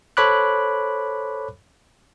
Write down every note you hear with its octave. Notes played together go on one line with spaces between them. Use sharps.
A4 C5 C#5 B5 D6 F#6